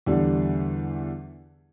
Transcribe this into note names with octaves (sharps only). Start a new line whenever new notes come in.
E2 D3 G3